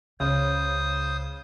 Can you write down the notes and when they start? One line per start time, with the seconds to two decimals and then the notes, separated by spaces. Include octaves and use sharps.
0.20 C#2 C#3 C5 D#6